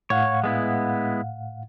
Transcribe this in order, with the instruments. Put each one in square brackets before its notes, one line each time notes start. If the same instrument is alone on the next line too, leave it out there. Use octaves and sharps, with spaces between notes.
[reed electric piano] A2 F5 F#5 [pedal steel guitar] C#5
[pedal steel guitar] G#3 B3 E4